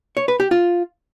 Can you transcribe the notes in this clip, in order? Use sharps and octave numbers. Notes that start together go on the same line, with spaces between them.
C#5
B4
G4
F4